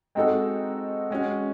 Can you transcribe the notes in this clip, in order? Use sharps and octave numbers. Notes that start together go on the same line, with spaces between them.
G#3 C4 D#4 F#4 A4
G#3 C#4 F#4